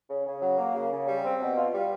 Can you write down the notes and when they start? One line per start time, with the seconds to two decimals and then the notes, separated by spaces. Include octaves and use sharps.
0.09 C#3
0.26 C#3
0.42 F#3
0.58 A#3
0.75 C#3
0.92 C#3
1.08 G3
1.24 C4
1.41 B2
1.57 F4
1.74 G3